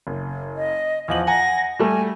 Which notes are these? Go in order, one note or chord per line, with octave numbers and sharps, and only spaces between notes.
F#1
D#5
E2 F3 D#5 F#7
F#5 G#5 A#5 A#6
G3 A3 G#5